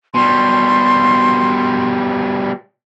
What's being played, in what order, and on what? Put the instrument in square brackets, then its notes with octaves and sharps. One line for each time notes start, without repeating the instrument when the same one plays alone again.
[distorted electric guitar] B2 G3 [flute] C6